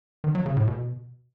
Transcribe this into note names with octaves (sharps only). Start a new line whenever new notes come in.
D#3
F#3
C#3
A2
B2